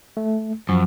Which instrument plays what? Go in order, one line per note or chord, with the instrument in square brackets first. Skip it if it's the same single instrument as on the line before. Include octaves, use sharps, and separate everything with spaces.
[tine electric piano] A3
[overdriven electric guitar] F#2 [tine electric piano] F3